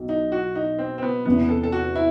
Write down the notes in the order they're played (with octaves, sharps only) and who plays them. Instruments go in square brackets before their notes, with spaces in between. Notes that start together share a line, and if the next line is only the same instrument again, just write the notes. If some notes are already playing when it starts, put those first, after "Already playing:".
Already playing: [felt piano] B1 F#3
[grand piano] D#4
F#4
D#4
C4
C4
B3
[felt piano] E2 C3 E3 [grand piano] B3
[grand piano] A4
A4
F#4
E4